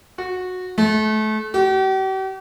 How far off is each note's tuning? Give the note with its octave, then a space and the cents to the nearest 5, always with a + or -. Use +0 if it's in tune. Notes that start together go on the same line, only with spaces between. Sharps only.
F#4 -15
A3 -30
G4 -45